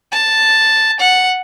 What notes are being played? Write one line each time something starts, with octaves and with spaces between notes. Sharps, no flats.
A5
F#5